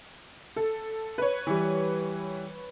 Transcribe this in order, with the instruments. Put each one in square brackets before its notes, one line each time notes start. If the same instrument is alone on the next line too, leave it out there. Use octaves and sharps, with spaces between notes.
[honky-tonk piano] A4
B4 C#5
[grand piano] E3 G3